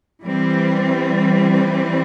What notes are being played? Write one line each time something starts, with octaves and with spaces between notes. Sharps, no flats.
E3 G3 C4